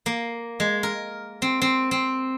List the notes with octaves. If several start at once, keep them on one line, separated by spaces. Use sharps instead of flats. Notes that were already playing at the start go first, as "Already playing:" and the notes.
A#3
G#3
A#4
C4
C4
C4